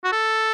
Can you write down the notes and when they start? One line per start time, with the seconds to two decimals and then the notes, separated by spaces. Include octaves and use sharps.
0.04 F#4
0.12 A4